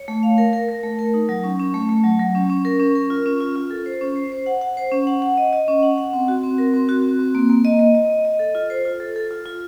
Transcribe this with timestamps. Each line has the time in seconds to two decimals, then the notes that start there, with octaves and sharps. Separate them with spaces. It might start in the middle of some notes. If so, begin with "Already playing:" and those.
Already playing: C#5
0.08 A3
0.23 F5
0.38 A#4
0.53 A#4
0.68 A#4
0.83 A3
0.99 A#4
1.14 D#4
1.29 F#3
1.44 C#4
1.59 C#4
1.74 A3
1.89 A3
2.04 F#3
2.19 F#3
2.35 C#4
2.50 C#4
2.65 A#4
2.80 C#4
2.95 A#4
3.10 F4
3.26 C#4
3.40 F4
3.56 F4
3.71 A4
3.86 C5
4.01 C#4
4.16 C5
4.32 C5
4.46 F#5
4.61 F#5
4.77 C5
4.92 C#4
5.07 F#5
5.22 F#5
5.38 D#5
5.53 D#5
5.68 C#4
5.83 F#5
5.98 F#5
6.13 C4
6.28 F#4
6.43 C4
6.58 A#4
6.74 C4
6.89 F#4
7.03 C4
7.19 C4
7.35 A#3
7.50 A#3
7.65 D#5
7.79 D#5
7.95 D#5
8.10 D#5
8.25 D#5
8.39 A4
8.55 F4
8.70 C5
8.85 F4
9.00 A4
9.16 A4
9.31 F4
9.46 F4